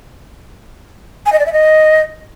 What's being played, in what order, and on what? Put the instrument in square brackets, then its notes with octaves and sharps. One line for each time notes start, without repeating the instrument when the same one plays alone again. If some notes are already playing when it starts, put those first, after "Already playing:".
[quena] G#5
D#5
D5
E5
D#5